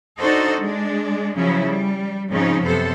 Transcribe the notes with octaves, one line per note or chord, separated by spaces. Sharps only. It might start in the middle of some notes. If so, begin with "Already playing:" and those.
D4 D#4 F#4 A4 C5 D#5
G#3 D4
C#3 F3 F#3 C#4 E4
G3
G#2 C#3 F3 C4 C#4 D#4
F#2 C3 B3 A4 C5